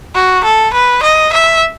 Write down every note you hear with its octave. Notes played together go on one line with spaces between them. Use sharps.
F#4
A4
B4
D#5
E5